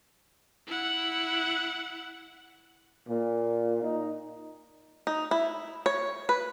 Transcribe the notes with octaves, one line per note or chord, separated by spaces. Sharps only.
E4 F#5
A#2
D#4
D#4
E4
C#5
B4